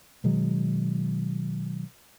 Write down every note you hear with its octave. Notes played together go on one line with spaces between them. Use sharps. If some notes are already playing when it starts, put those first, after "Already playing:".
B2 D#3 F#3 G#3